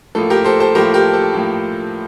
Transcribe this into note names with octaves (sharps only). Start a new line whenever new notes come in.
A2 F3 A#3 A4
G4 A#4
A4 C5
A4 C5
A2 F3 A#3 G4 A#4
G4 A#4
A4
A2 F3 A#3